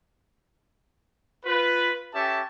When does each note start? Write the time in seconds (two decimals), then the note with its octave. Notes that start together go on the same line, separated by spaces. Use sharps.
1.45 F4 B4
2.14 C#4 G4 A4 E5 A5